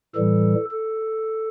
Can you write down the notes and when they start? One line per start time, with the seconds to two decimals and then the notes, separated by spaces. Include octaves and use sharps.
0.15 A2 E3 G3 A4
0.71 A4